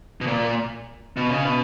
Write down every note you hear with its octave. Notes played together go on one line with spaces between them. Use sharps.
B2
A#2
B2
C#3
B2